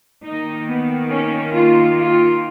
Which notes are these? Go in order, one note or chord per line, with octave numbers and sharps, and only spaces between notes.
D#3 A#3 D#4
B3
C#4
F4
F4